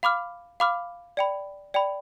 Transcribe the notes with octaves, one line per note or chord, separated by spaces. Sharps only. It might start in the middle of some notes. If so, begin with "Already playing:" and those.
F5 B5 D6 F6
F5 B5 D6 F6
D5 G5 B5
D5 G5 B5